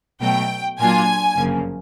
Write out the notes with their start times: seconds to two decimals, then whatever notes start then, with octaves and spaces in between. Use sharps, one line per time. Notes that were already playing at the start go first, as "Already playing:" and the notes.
0.21 B2 F#3 A3 G5
0.78 A#2 F#3 A#3 D4 F4 G#5
1.36 G1 F#2 C#3 F3 A#3